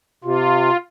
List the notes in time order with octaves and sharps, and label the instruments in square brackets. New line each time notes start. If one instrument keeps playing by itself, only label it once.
[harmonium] C3 [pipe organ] F4